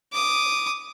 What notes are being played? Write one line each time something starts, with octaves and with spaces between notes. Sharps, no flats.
D6 D#6